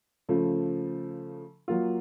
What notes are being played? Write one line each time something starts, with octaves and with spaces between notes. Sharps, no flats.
C#3 F3 A3
F#3 A#3 F4